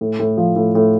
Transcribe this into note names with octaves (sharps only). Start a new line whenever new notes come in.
A2
A2
F3
A2
A2